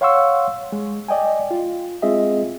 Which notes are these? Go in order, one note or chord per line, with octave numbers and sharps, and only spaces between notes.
C#5 F5 F#5 C6 C#6 E6
G#3
D5 D#5 G5 G#5
F4
G#3 C4 F4 G#4 D#5 E5